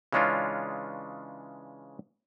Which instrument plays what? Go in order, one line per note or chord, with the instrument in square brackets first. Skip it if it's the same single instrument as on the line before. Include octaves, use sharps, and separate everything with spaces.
[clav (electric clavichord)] C#3 E3 G#3 C#4 D4 F4